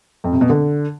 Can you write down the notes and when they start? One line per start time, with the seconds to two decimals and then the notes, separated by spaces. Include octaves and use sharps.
0.24 F2
0.32 C3
0.41 B2
0.49 D3